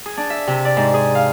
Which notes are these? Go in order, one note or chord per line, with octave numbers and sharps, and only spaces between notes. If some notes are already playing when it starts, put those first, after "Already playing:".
G#4
D4
E5
C3
D5
G#2
G#4
F5